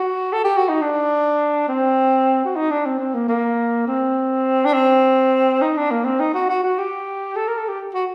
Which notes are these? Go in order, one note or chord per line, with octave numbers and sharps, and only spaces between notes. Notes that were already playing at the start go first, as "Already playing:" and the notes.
Already playing: F#4
A4
G4
F#4
D#4
D4
C4
F#4
D#4
D4
C4
C4
A#3
A#3
C4
D4
C4
D#4
D4
A#3
C4
D#4
F#4
F#4
F#4
G4
A4
A#4
A4
G4
F#4